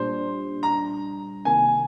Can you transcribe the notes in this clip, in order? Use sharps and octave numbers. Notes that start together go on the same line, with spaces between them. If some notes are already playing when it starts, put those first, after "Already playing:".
Already playing: A#2 G3 D4 C5
A#5
C3 D#3 A#3 G#5